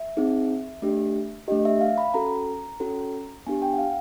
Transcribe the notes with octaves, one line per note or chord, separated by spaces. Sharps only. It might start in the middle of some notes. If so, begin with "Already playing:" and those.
Already playing: E5
C4 D#4 G#4
A3 D4 G4
A3 D4 G4 D#5
E5
F5
B5
C#4 F#4 A4 A#5
C#4 F#4 A4
B3 D4 G4 G#5
G5
F#5
F5